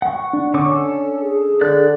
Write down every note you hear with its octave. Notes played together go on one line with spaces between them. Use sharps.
F#5 C#6
D4
D3 C#4 C#6 D6
A4
G#4
D3 D5 F#6